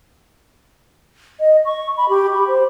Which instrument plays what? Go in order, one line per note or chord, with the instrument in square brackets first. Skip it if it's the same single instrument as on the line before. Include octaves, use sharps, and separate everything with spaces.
[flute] D#5
C#6
B5
G4
B5
C5